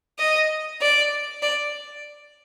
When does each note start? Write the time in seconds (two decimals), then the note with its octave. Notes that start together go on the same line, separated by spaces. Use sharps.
0.19 D#5
0.81 D5
1.42 D5